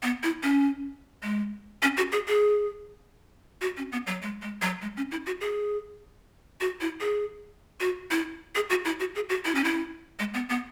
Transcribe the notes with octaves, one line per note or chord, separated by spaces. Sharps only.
B3
E4
C#4
G#3
C#4
F#4
G#4
G#4
F#4
C#4
B3
F#3
G#3
G#3
F#3
G#3
C#4
E4
F#4
G#4
F#4
E4
G#4
F#4
E4
G#4
F#4
E4
F#4
G#4
F#4
E4
C#4
E4
G#3
B3
B3